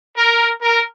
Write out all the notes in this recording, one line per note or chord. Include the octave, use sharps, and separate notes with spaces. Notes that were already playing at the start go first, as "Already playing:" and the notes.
A#4
A#4